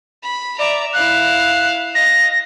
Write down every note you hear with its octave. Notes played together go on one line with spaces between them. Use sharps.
B5
D5 E5 A#5
E4 F5 F#6
D#5 F5 A#6